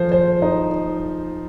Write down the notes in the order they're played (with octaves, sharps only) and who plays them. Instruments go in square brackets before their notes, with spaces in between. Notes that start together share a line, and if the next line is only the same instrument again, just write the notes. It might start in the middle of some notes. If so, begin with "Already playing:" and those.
Already playing: [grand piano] F3 C5
C5
D#4